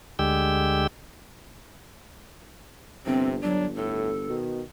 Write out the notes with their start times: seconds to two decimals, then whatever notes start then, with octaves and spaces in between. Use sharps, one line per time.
0.19 D2 D3 G#3 G4 G5 E6
3.06 G1 C3 C4
3.43 G1 F#3 D4
3.76 A2 A4
4.29 B2 D#3